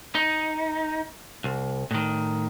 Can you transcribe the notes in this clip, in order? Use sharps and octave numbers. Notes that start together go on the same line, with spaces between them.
D#4
C2
A2 D#3